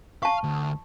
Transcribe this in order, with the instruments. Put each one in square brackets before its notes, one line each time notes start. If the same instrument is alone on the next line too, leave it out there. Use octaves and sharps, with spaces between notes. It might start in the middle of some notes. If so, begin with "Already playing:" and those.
[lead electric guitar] F5 [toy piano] A5 C#6
[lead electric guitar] D2